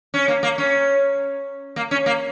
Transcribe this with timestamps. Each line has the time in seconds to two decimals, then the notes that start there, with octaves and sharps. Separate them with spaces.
0.14 C#4
0.28 A#3
0.43 A#3
0.58 C#4
1.76 A#3
1.91 C#4
2.06 A#3